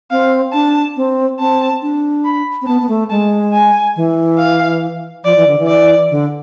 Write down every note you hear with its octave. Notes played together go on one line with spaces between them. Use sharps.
C4 F5
D4 A5
C4
C4 A5
D4
B5
C4
B3 A5
B3
A3
G#3 A5
G#5
E3
F5
F3 D5
E3
D3
E3
D5
D3